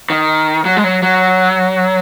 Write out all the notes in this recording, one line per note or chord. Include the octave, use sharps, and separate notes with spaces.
D#3
F#3
G#3
F#3
F#3